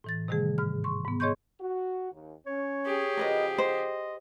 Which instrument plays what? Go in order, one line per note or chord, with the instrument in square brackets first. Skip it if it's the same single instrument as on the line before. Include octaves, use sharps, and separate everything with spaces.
[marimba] A2 E3 A6
C3 D#3 G3 A3 G#4
G#2 F6
C6 C#6
G#2 B3
G#4 C#5 D#5 C6 C#6 G6
[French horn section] F#4
D#2
[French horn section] C#4 [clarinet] C#5
[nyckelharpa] G4 G#4
[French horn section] C#3 F3 F#4 [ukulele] A#4 B4 D#5
[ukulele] C5 [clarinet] D#5